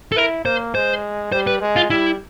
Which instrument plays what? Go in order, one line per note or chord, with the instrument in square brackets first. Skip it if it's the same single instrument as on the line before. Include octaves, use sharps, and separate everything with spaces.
[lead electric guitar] A4
[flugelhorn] E4 [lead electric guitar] A#4
[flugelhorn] A#3 [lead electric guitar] C5
[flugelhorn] G#3 [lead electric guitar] C5
[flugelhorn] G3 [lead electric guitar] C5
[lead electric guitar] B4
[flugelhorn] G#3
[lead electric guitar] F4
[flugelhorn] G3 [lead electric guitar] E4